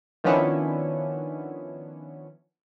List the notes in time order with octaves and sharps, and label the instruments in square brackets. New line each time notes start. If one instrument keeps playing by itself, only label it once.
[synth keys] D#3 F3 B3 C#4 D4 E4